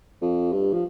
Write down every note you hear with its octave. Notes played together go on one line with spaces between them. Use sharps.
F2
G2
F3